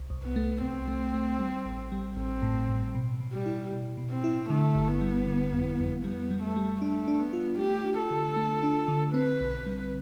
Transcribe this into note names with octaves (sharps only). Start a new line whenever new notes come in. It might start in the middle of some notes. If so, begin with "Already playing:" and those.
Already playing: C2
C2
B3
A3
C2 C4
A3
A3
G3
A1
G3
A1 C4
A2
A2
B2
B2
G3
E4
B2
B2
C4
E4
D3 A3
G1
B3
G3
D3
F2
F2
G3 B3
G3
A3
G3
A3 D4
D4
B3
F4
A3 G4
D4
A4
D3
A3
D4
D3
C4 B4
B1
G3